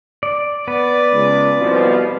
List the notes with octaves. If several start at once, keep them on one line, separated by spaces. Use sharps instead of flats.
D5
B3 B4 D5
C#2
C2 B2 F3